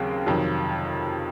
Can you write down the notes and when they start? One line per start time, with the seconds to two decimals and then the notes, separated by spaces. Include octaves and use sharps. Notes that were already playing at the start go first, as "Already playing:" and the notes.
Already playing: D#2 C#3 F#3 C4
0.26 F2 C3 D#3 F#3